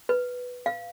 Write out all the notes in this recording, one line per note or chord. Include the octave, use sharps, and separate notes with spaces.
B4
F5